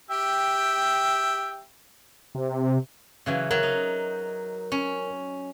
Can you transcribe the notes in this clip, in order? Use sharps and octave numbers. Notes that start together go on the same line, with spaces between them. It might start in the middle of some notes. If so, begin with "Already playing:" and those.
G4 E5 G5
C3
C#3 E3 F#3
F#3 A#4
D#4
C#4